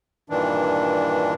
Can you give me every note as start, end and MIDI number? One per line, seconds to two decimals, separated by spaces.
0.30 1.34 43
0.30 1.34 46
0.30 1.34 51
0.30 1.34 52
0.30 1.34 62